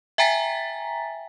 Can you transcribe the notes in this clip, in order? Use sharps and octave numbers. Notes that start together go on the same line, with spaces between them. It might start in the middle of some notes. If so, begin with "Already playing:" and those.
E5 G5 G#5 A#5 A6 B6